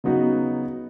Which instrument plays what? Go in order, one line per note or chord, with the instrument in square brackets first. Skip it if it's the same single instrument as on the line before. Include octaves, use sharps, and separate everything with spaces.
[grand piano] C#3 F#3 B3 D#4 F#4